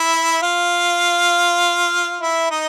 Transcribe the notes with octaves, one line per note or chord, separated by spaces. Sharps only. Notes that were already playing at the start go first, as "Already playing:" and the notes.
Already playing: E4 E5
F4 F5
E4 E5
D#4 D#5